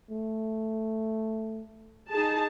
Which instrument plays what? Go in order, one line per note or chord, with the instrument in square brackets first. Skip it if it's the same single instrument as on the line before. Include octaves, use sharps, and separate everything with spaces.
[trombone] A3
[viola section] D#4 G#4 A5